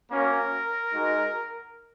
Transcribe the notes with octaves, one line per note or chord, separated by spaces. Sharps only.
A#3 C#4 F#4 A#4
G#3 D#4 F#4